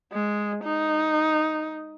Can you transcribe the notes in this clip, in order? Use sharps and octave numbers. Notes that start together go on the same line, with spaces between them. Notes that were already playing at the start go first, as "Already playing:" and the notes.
G#3
D#4